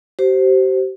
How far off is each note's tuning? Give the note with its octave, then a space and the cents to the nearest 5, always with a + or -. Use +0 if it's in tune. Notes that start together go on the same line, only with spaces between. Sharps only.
G4 -40 C5 +0